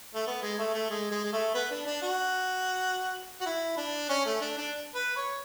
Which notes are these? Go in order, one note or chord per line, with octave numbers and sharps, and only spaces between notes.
A3
B3
G#3
A3
A3
G#3
G#3
G#3
A3
B3
D4
D4
F#4
F#4
E4
D4
C#4
A3
D4
D4
B4
C#5